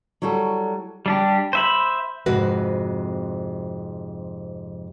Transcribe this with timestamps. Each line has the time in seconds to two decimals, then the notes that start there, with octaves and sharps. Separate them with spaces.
0.22 F#3 G3 E4 F#4 A4
1.06 G3 D4 G4
1.53 C5 E5 B5
2.26 F2 G#2 C3 F#4 B4